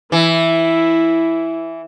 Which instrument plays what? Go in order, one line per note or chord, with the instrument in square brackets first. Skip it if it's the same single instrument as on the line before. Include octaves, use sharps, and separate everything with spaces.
[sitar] E3 [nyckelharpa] E4